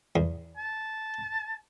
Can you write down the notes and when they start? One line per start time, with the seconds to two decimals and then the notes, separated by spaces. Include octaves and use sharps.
0.16 E2
0.57 A5